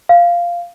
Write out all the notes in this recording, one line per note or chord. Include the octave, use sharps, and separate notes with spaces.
F5